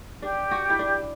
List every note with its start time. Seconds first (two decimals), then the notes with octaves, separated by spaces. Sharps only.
0.22 D4 G4
0.51 F#4
0.70 E4
0.79 D4